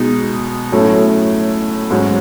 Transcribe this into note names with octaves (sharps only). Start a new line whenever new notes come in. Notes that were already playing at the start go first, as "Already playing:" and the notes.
Already playing: B2 G#3 D#4
A2 F#3 A3 C#4
G#2 F#3 C#4